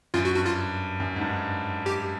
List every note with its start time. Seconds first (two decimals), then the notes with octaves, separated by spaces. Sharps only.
0.14 F#2 F4
0.25 F#4
0.36 G2 F#4
0.46 F4
1.00 F#2
1.16 G#2
1.21 G2
1.86 G4